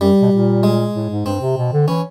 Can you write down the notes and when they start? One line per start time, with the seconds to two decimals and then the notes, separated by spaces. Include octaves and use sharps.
0.01 F#2 G3
0.22 B2
0.32 A#2
0.63 G#3
0.95 A2
1.10 G#2
1.26 G2 C4
1.41 C3
1.57 B2
1.73 D3
1.88 E3 C#4